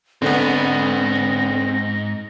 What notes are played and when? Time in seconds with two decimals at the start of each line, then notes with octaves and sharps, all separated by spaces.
0.22 G#2 D3 A3 B3 C4 A#6